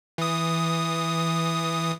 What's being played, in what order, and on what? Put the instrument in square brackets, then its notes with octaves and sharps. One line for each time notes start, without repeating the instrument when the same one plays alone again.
[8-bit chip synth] E3 D#6